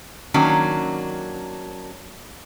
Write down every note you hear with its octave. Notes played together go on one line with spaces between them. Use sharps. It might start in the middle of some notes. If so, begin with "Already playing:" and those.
D#3 F#3 A#3 C#4 D4